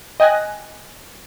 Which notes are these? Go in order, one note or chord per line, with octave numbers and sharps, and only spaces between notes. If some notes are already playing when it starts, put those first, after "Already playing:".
D#5 G5 G#5 F#6 A#6